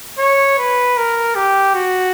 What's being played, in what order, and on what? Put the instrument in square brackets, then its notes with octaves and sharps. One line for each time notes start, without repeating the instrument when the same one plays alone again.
[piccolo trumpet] C#5
B4
A#4
G4
F#4